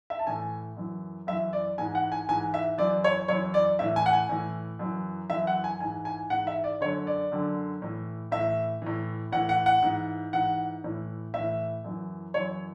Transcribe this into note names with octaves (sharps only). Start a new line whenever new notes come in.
E5
A5
A2 E3 G#5
F#2 E3
F#2 E3 E5
D5
G#2 E3 G#5
F#5
G#5
G#2 E3 G#5
E5
F#2 E3 D5
C#5
F#2 E3 C#5
D5
A2 E3 E5
G#5
F#5
G#5
A2 E3
F#2 E3
F#2 E3 E5
F#5
G#5
G#2 E3 G#5
G#5
G#2 E3 F#5
E5
D5
F#2 D3 C#5
D5
F#2 D3
A2 E3
A2 E3 E5
A2 E3
A2 E3 F#5
F#5
F#5
G#2 E3
G#2 E3 F#5
A2 E3
A2 E3 E5
F#2 E3
F#2 E3 C#5